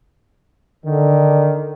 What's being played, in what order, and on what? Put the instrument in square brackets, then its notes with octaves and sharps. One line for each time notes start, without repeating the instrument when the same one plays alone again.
[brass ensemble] D3 [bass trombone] D#3